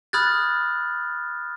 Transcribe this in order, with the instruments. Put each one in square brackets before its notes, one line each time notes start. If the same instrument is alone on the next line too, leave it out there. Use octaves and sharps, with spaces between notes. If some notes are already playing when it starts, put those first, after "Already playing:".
[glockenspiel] B5 D#6 F6 F#6 G#6 A6